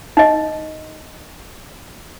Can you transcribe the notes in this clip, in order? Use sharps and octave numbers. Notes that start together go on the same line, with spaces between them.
D#4 D#5